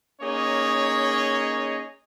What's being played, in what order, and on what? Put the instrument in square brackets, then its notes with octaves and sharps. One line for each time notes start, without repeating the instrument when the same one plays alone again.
[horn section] A#3 C#4 D#4 G#4 C#5 D#5